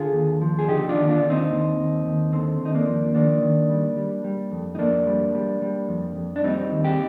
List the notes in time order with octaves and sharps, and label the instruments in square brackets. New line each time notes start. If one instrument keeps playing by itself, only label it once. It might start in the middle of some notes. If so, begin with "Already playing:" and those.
Already playing: [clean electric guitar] D3 F4 G#4
D#2
F3
G#4
D3 D#4 G4
D4 F4
D#2
D4 F4
D#2
C4 D#4
D#2
D#2
D#2
D3 C4
D#2
D#4
A#3 D4
F3
D#3 A#3 D4
D#3
G3
G3
G3
F2
D#4
F2 A#3 D4
G3
G3
G3
F2
F2
D4
G3 C4 D#4
D#2
D#4 G4